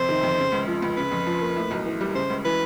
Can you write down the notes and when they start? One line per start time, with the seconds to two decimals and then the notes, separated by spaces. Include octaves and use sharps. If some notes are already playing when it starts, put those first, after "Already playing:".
Already playing: F2 C3 C5
0.09 D#3
0.23 F2
0.38 C#3
0.52 C#2
0.67 F3
0.82 C#2
0.97 C#3 B4
1.12 F2
1.27 F3
1.41 A#3
1.56 A2
1.71 B1
1.86 E3
2.01 G3
2.15 C#3 C5
2.30 C#2
2.45 E3 B4